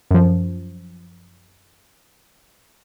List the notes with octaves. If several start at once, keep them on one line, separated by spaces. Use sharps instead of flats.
F#2 F3